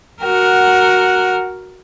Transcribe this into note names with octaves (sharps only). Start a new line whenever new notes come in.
F#4 A#4 F#5